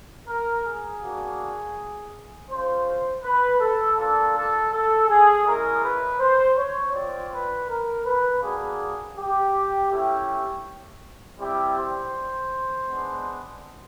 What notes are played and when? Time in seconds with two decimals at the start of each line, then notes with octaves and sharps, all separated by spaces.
0.28 A#4
0.65 G#4
1.02 A#3 D4 F#4
2.49 G#3 C#4 F4 C5
3.24 B4
3.60 A4
3.97 A#3 D4 F4 A4
4.35 A4
4.72 A4
5.09 G#4
5.46 G#3 C#4 E4 A#4
5.83 B4
6.20 C5
6.57 C#5
6.94 C4 F4 D5
7.31 B4
7.69 A#4
8.06 B4
8.42 A#3 D4 F#4 G#4
9.17 G4
9.92 A3 C#4 E4 G4
11.39 G3 C4 E4 G4
11.77 C5
12.88 G#3 B3 D4